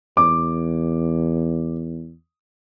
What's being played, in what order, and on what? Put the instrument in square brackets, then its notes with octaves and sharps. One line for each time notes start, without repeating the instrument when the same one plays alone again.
[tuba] E2 [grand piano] D6